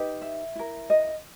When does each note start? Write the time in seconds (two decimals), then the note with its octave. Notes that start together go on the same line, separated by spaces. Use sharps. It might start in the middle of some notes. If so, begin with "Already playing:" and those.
Already playing: D#4 G4 B4
0.22 E5
0.56 E4 A#4
0.90 D#5